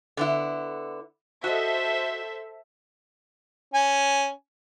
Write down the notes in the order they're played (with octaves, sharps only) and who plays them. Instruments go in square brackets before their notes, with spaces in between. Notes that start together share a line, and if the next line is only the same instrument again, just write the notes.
[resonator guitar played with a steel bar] D3 B3 E4
[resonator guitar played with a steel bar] F#4 D#5 [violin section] A4 C5 E5
[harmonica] C#4 G#5